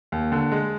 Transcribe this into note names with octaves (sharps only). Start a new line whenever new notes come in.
D#2
D3
G#3